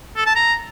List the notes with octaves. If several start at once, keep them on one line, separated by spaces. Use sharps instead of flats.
A4
A5
A#5